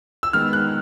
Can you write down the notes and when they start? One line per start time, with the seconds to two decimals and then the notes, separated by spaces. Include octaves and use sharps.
0.23 E6
0.33 D#3 G#3 B3 F6
0.53 F#6